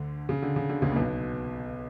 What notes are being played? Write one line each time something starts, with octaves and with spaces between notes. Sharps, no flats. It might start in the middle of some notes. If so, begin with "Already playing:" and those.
Already playing: D2 D3
C#3
D3
C#3
D3
C#2 C#3
A#2
B1 B2